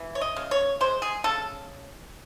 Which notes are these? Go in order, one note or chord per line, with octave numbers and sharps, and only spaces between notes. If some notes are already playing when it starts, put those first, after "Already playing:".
Already playing: E3
C#5
D#5
C#3
C#5
G#3 C5
G#4
C#3 A4